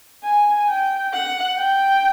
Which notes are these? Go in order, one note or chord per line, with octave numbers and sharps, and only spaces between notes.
G#5
G5
F#5
G5